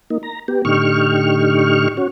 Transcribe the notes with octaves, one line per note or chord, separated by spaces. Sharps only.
A#3 D#4
A#5
B3 G4
A2 D3 D#4 G4 C#6 F6
C#4 F#4